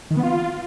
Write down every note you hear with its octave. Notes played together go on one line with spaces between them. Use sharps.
D#3
B3
F4